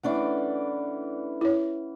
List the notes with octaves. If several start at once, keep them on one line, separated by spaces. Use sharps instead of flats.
E3 A3 C#4 D4 D5 F#5
E4 C#5